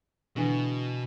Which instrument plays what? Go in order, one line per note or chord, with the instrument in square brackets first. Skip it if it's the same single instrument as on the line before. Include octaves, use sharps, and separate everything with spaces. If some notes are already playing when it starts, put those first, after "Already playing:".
[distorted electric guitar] B2 [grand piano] D3 E3